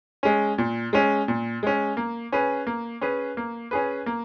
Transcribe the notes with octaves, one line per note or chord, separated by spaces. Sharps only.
G#3 C#4
A#2
G#3 C#4
A#2
G#3 C#4
A#3
C#4 G#4 B4
A#3
C#4 G#4 B4
A#3
C#4 G#4 B4
A#3